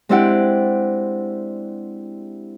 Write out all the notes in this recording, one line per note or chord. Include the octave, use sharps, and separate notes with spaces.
G#3 C4 D4 E4 G4 F#5